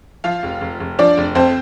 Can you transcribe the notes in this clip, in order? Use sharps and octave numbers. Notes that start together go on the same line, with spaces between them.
F3 F4 F5
F1
F1
F1
F3 D4 D5
F1
F2 C4 C5